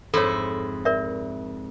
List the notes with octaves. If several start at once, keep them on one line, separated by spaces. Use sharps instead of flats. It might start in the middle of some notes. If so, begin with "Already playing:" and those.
F2 G#2 E4 A4 C#5
A#4 D5 E5